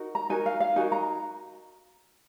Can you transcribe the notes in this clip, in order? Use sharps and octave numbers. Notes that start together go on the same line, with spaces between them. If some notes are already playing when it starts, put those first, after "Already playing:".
Already playing: D#4 F#4 A#4
A#5
D#4 F#4 A#4 G#5
F5
F5
D#4 F#4 A#4 G#5
A#5